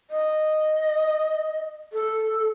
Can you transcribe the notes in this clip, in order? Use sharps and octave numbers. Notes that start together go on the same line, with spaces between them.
D#5
A4